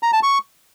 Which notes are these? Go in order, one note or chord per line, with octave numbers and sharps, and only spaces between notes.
A#5
A5
C#6